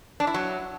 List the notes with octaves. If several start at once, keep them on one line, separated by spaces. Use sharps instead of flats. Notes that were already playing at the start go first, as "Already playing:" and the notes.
D4
E4
F#3